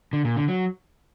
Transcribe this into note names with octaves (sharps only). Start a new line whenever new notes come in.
D3
A#2
D3
F#3